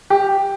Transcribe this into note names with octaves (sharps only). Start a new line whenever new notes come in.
G4